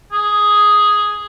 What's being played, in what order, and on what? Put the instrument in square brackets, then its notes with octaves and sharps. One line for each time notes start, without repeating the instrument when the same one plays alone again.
[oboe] G#4